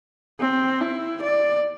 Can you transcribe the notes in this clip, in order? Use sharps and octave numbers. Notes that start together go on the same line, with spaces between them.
C4
E4
D5